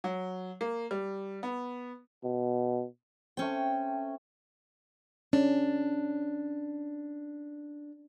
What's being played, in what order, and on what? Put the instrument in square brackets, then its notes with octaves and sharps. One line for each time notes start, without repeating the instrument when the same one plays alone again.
[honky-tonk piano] F#3
A#3
G3
B3
[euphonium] B2
[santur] A3 C4 [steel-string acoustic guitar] C#4 G5
[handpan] C#4 [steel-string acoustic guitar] D4